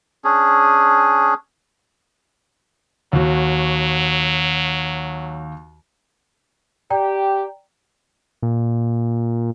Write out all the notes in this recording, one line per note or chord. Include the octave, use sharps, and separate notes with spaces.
C#4 D4 G#4
D#2 F#3 F#4
G4 D5 G5 A#5
A#2